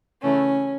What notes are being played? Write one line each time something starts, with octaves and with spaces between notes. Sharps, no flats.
C#3 E3 A3 C#4